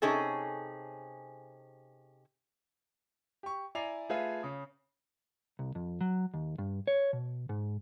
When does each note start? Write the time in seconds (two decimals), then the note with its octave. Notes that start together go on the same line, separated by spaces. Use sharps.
0.02 C3 C#4 D#4 G#4 A4
3.43 G4 C#6
3.75 E4 D5 G#5 A#5 C7 F7
4.09 A3 F4 G#4 B4 E5 F5
4.43 C#3 D#6
5.59 C2
5.75 F2
6.01 F#3
6.34 D#2
6.58 G2
6.87 C#5
7.13 B2
7.49 G#2